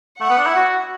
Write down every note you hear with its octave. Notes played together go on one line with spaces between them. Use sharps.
A3 F#5
B3
D4
E4
F#4